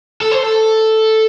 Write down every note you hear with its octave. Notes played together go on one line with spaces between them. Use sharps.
A4
C5
A4